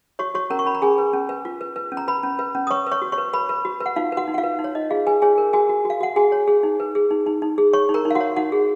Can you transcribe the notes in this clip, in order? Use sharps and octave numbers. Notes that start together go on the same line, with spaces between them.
F#4 C#5 C#6
F#4 C#5 C#6
C#4 A#4 A#5
C#6
C#4 B5
A#5
C#4 G#4 G#5
B4
C#4
B4
F4
B4
B4
C#4
A#5
B4 B5
C#4
B4
C#4
D#6
B4 C#5 C#6
B4
C#5 C#6
F#4
C#5 C#6
B4
B4 B5
B4
F#4
B4
F#5
D#4 F4 F5
F#4 B4 F#5
D#4
F#5
F4 F5
B4
D#4
C#5
D#4 D#5
F4 G#4 F5
G#4 B4 G#5
G#4 C#5 G#5
A#4
F#4 G#4 G#5
F#4
F#4
F5
F#4 F#5
F#4 G#4 G#5
C#5
G#4
D#4
B4
G#4
D#4
D#4
D#4
G#4
C#5 C#6
D#4
A#4 A#5
D#4
F5
F#4 F#5
C#5
D#4 F#4 F#5
G#4